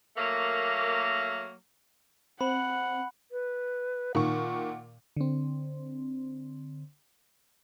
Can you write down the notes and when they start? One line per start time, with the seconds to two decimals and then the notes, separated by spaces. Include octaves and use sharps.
0.17 F#3 A3 A#3
2.41 C4 F#5 B5
3.32 B4
4.15 A#2 D#3 F#5 C#6
5.17 D3 C4